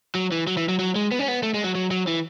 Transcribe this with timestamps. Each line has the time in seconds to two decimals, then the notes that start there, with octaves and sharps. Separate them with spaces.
0.15 F#3
0.32 E3
0.47 F#3
0.57 E3
0.69 F#3
0.79 F#3
0.96 G#3
1.11 B3
1.19 C#4
1.28 B3
1.43 A3
1.54 G#3
1.64 F#3
1.75 F#3
1.91 F#3
2.07 E3